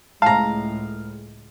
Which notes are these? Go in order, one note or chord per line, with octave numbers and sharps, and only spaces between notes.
C#2 A2 G#3 F5 A5 A#5